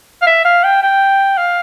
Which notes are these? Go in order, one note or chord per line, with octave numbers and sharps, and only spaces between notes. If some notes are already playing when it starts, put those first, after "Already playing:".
F5
E5
F5
G5
G5
F5